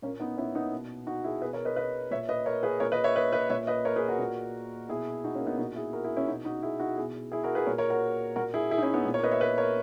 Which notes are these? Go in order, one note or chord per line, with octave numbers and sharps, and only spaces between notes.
A#2 A#3 C#4
B3 D#4
C#4 E4
B3 D#4
B2
D#4 F#4
E4 G#4
B2 G#4 B4
A#4 C#5
B4 D#5
B4 D#5
A#2 C#5 E5
B4 D#5
A#4 C#5
G#4 B4
A#2 A#4 C#5
B4 D#5
C#5 E5
B4 D#5
B4 D#5
A#2 C#5 E5
B4 D#5
A#4 C#5
G#4 B4
F#4 A#4
A#2
B2 E4 G#4
D#4 F#4
A#3 C#4
B3 D#4
A#2 D#4 F#4
E4 G#4
F#4 A#4
E4 G#4
C#4 E4
B2 D#4 F#4
D#4 F#4
E4 G#4
D#4 F#4
B2 E4 G#4
E4 G#4
F#4 A#4
G#4 B4
A#2 A#4 C#5
A#4 C#5
F#4 A#4
A#2 F#4 A#4
E4 G#4
E4 G#4
D#4
C#4 E4
B3 D#4
A#2
A#4 C#5
B4 D#5
C#5 E5
B4 D#5
A#4 C#5